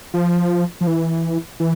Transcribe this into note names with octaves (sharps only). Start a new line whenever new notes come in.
F3
F3
E3
E3